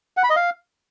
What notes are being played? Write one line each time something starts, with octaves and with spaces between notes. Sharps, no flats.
F#5
B5
D#5
F5